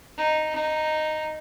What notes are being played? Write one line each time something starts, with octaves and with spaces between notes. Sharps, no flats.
D#4
D#4